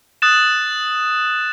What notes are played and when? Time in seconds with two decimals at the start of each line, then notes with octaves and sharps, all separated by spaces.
0.22 D#6 F#6 A6 E7